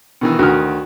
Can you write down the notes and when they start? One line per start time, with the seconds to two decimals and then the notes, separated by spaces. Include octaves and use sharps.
0.21 B2 D#3 E3
0.39 D2 D#3 F#4 F6